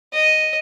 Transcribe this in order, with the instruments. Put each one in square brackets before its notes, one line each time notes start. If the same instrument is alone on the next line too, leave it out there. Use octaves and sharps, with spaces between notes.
[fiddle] D#5